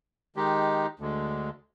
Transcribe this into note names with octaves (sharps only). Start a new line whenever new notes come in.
D#3 G#3 D#4 G4
D2 D3 G#3